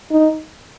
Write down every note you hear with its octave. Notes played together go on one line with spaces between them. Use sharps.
D#4